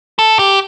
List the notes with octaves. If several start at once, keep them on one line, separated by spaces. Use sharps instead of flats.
A4
G4